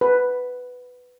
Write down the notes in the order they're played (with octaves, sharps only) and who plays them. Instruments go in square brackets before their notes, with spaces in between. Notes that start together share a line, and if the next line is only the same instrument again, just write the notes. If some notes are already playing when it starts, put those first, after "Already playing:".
[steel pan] B4